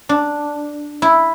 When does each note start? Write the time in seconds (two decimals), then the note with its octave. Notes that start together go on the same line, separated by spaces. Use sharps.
0.09 D4
1.02 E4